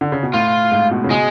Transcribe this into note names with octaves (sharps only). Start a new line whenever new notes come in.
D3
C#3
B2
A2 F4
G#2
B2
C#3
B2 G#3